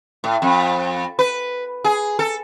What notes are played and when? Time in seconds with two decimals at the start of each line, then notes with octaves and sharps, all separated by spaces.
0.24 A2
0.42 F2
1.19 B4
1.84 G#4
2.19 A4